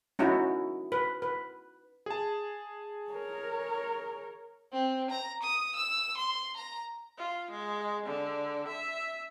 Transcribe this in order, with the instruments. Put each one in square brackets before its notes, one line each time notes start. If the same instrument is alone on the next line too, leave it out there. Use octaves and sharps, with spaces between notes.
[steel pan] C#4 D#4 E4 F#4
B4
B4
[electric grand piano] G#4 A5
[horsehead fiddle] A#4 C#5
[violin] C4
A#5
D#6
E6
C6
A#5
[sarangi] F4
G#3
D3
E5